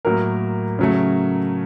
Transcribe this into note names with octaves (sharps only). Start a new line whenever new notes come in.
A2 F#3 A#3 A#4
C#3 F#3 A3